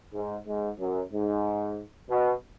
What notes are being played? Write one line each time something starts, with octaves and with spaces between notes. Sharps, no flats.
G#2
G#2
F#2
G#2
B2